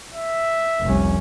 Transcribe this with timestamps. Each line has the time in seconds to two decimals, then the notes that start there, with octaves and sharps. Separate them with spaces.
0.13 E5
0.82 F1 C2 C#4